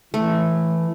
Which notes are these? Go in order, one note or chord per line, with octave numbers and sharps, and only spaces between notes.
E3 A3